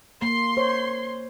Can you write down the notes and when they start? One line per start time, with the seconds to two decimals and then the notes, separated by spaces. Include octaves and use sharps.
0.22 A#3 C6
0.57 C5 C#5